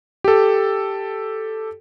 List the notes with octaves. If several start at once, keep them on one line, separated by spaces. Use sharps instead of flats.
G4 A4